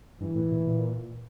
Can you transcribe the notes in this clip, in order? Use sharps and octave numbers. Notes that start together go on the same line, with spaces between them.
G2 E3
A2
A#2
A#2